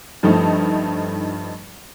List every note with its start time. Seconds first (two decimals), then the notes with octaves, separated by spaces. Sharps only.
0.23 G2 F3 A3 D#4 A5